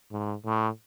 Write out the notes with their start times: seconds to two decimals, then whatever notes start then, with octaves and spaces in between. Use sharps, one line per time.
0.12 G#2
0.45 A2